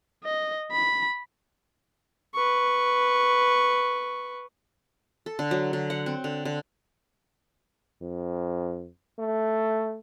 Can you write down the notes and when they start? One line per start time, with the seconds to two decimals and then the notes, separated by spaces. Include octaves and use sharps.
0.24 D#5
0.72 B5
2.35 B4 C#6
5.26 A4
5.39 D3
5.51 F#3
5.73 D3
5.90 F#5
6.06 C4
6.24 D3
6.45 D3
8.02 F2
9.19 A3